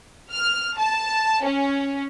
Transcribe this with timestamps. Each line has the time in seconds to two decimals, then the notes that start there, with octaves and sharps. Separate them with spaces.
0.32 F6
0.78 A5
1.42 C#4